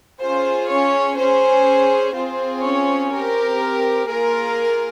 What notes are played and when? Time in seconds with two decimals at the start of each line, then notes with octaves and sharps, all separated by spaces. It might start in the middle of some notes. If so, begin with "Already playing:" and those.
0.20 C#4 F4 G#4 C5
0.69 C#4 C#5
1.17 C#4 G#4 C5
2.14 C4 F4 G#4 C5
2.63 C#4 C#5
3.11 C4 G4 A#4
4.08 A#3 F4 G#4 A#4